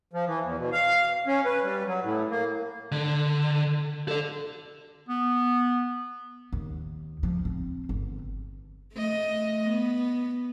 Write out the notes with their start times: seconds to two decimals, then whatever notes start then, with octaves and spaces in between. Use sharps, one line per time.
0.13 F3
0.27 E3
0.43 E2
0.58 B2
0.72 F5
1.27 C#4
1.45 B4
1.63 G3
1.86 F#3
2.03 A2
2.30 A#3
2.92 D3
4.08 A4 D5
5.09 B3
6.53 D#2
7.23 F3
7.45 C4
7.89 G1
8.93 A3 D#5
9.68 B3